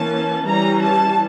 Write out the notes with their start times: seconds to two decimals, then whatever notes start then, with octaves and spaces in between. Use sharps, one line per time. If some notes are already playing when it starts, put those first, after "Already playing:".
Already playing: E3 A#3 C#4 A5
0.45 E3 G3 C#4 A#5
0.81 A5